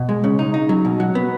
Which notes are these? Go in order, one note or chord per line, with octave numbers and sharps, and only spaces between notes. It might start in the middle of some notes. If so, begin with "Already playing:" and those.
Already playing: B2
G#3
C#3
D#4
D#4
F#3
B2
F#3
B3